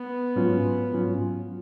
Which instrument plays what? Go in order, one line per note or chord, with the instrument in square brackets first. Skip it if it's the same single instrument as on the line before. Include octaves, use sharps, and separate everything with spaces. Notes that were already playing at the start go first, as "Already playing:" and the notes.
Already playing: [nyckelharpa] B3
[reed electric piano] G#2 F#3 C#4 F4
G#2 F#3 C#4 F4